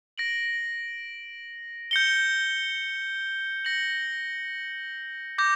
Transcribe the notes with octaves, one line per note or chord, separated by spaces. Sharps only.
A#6 D7 F#7
G6 C#7 G7
A#6 C#7 F#7
D6 G6 A#6